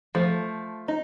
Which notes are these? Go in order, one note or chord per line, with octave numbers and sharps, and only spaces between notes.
F3 A3
D#4